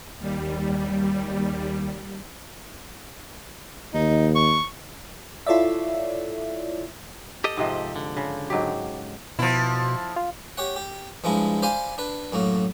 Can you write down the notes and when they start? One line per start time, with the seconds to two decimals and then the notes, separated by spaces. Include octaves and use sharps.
0.18 D#2 G3
3.94 D#2 D#4
4.36 C#6
5.46 E4 F4 A4 C#5 D5 E5
7.44 G4 A4 D#5
7.57 G#2 C3 F3
7.96 D3
8.16 C#3
8.50 G#2 F#3 G4
9.39 B2 F3 E4
10.16 F4
10.57 G4 C#5 F#5
10.76 G4
11.24 G2 F3 G#3 D4 E4
11.62 C5 D5 F5 G#5 B5 C6
11.98 D4 B4
12.32 F#2 A2 A#3 F#4